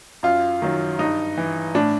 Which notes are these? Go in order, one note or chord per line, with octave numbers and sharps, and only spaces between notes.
F#2 F4
D#3 F#3
G2 D#4
E3
A2 D4